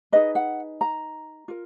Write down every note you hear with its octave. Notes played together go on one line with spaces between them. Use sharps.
D#4 G#4 B4 D#5
F#5
A#5
F4 A#4